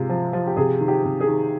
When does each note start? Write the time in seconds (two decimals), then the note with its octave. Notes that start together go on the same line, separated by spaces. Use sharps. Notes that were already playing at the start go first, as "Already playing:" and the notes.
Already playing: C3 G#3 F4
0.10 F3
0.33 F3
0.47 G4
0.57 C3 G#4
0.81 D#3
0.88 G4
1.05 C3
1.20 G#4
1.28 D#3